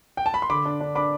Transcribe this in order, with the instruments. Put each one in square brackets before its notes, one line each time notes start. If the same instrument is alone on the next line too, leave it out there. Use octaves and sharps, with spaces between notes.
[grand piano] G5
A5
B5
C6
D3 B5 D6
D4
D4
D4 B5 D6